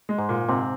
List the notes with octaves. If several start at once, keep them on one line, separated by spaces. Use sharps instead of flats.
G#3
G#2
A#2
G#2 C3 C4